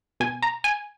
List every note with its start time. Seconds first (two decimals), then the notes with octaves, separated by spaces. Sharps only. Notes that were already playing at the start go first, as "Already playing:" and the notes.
0.20 B2 G#5
0.43 A#5
0.64 G#5